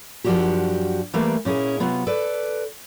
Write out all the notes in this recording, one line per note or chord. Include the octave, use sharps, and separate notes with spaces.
F#2 F3 A3 D4 F#4 G4
E3 G3 A3 A#3 B4
A#2 C#4 E4 G#4
C3 F#3 B3 F4
A4 B4 D5